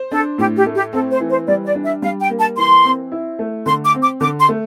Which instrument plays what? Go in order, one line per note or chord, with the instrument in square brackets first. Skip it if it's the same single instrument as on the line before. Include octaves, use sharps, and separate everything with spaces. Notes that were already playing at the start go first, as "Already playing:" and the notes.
Already playing: [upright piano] C5
[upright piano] D4 [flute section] A4
[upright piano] A2 [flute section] G4
[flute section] G4
[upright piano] A3
[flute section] G4
[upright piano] C4 [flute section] A4
[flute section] C5
[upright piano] E3
[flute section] C5
[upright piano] G3 [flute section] D5
[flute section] D5
[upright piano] D4
[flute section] E5
[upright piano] G3 [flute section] F5
[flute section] G5
[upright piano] A#3
[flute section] A5
[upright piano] E3 [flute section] C6
[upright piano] C4
E4
A3
[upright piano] D3 [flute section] C6
[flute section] D6
[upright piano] C4
[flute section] D6
[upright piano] D3 [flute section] D6
[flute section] C6
[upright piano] A3